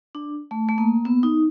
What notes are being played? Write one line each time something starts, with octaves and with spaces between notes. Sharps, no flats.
D4
A3
A3
A#3
B3
D#4